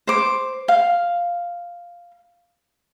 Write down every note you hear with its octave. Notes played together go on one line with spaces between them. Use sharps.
C5 D6
F5